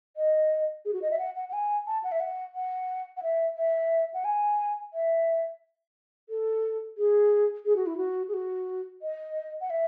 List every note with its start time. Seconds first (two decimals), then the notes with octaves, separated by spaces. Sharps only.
0.17 D#5
0.85 G#4
0.93 F#4
1.02 D#5
1.11 E5
1.19 F#5
1.36 F#5
1.49 F#5
1.53 G#5
1.87 A5
2.04 F#5
2.12 E5
2.20 F#5
2.55 F#5
3.17 F#5
3.23 E5
3.57 E5
4.14 F#5
4.25 G#5
4.94 E5
6.29 A4
6.98 G#4
7.65 G#4
7.76 F#4
7.86 E4
7.97 F#4
8.28 G#4
8.34 F#4
9.02 D#5
9.61 F#5
9.70 E5